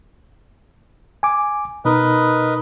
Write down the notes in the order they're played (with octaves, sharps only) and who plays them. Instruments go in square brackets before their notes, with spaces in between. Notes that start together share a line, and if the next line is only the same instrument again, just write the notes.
[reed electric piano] G#5 D6
[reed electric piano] B2 D#4 [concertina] A#4 B4 D#5